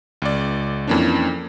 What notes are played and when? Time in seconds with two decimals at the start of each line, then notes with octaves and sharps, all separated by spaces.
0.22 C#2 D5
0.87 F2 E3 A#3 C#4 D4